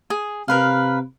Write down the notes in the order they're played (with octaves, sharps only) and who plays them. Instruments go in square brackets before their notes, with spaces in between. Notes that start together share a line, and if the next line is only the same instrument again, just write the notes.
[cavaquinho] G#4
[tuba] C3 [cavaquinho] A#4 B4 F5